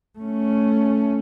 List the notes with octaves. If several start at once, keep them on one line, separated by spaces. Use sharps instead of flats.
A3 C#4